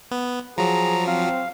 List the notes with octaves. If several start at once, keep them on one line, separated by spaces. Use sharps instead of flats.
B3
F3 F#3 G#4 A#5
C4 F5